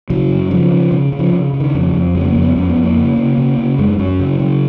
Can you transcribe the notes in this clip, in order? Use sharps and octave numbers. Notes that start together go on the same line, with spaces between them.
C#3 F#3
F#2
C#3 F3
C#3
C#3
C#3
F3
C#3
C#3
D#3
F2
F2
C#3 F#3
B3
A#3
F2
B3
F2 C#4
B3
F2
A#3
C#3
C#3
C#3
C#3
F#2 G#3
F#2 F#3
C#3
C#3